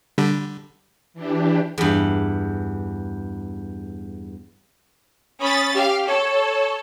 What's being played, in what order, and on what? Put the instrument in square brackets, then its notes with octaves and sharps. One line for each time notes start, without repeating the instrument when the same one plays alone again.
[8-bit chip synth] D3 G3
[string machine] E3 D4 G4
[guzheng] E2 G2
[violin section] C#4 B5 A6 [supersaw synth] D#6
[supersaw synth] G4 [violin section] F5
[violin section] A4 [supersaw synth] C#5